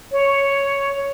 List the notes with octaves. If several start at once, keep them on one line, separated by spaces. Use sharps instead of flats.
C#5